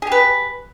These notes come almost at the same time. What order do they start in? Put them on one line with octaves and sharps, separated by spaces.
G#4 G4 B4